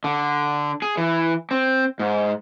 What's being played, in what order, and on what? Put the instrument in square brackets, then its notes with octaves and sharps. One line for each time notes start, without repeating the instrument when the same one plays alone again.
[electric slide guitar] D3
G#4
E3
C4
G#2